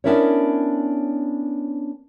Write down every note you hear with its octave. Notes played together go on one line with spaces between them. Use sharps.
B3 C#4 D4 E4 A#4 C#5